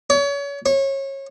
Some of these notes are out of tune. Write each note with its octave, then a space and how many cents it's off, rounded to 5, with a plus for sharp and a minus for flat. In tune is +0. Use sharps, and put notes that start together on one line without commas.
C#5 +35
C#5 -25